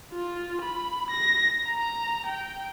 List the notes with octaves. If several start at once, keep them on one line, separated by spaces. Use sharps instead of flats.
F4
B5
A#6
A#5
G5